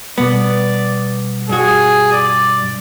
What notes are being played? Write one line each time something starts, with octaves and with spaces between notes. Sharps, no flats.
B2 G3 B3 D5
G2 F#4 G#4
D5